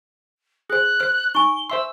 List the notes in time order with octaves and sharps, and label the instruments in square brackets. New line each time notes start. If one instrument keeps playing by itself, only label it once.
[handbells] G#4 C5 [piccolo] F#6
[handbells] C5 F6
[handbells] D#4 [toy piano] G#5 C#6 [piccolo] G7
[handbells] C5 E5 C6 [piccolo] E6